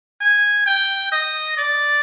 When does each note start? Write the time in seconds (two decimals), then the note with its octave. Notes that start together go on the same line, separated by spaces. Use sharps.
0.21 G#5
0.66 G5
1.12 D#5
1.57 D5